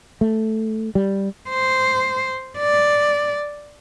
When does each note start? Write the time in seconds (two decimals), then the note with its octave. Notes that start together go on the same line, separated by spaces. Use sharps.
0.21 A3
0.95 G3
1.49 C5
2.59 D5